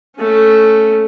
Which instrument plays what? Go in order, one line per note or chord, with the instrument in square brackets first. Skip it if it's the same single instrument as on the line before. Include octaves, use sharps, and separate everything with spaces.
[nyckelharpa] A3 C#4